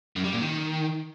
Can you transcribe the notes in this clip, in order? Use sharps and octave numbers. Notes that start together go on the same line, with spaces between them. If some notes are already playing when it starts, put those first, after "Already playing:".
F#2
G3
A#2
D#3